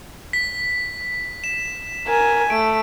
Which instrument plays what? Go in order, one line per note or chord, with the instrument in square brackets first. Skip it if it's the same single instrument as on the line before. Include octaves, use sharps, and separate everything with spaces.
[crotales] B6
E7
[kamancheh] A#4 G#5
[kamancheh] A3 [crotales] D7